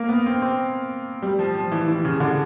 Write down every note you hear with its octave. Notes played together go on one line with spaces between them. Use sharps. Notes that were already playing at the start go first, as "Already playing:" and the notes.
Already playing: A#3
B3
C4
C4
G3
F3
F3
E3
E3
C#3
D3